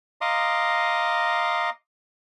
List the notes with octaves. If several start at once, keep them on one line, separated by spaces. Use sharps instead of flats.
D#5 F5 A#5 C6 D6 D#6